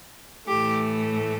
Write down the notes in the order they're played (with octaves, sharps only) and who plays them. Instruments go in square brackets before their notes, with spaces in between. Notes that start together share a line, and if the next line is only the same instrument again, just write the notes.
[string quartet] A2 E3 A3 G4